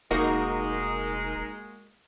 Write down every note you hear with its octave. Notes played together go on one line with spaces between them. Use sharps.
F1 G#3 A#3 D#4 F#4 A#4